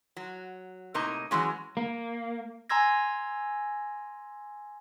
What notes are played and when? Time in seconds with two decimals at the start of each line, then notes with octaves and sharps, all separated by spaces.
0.16 F#3
0.94 A2 C3 A#3 D#4 D#5 A#5
1.31 E3 F#3 G#3 C#4
1.77 A#3
2.69 G#5 A#5 C6 E6 G#6 A#6